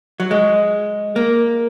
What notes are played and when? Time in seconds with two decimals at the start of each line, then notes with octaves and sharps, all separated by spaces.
0.20 F#3
0.31 G#3
1.16 A#3